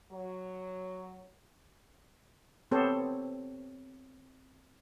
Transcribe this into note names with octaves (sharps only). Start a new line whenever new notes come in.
F#3
B3 C4 G4 A4 C5 C#5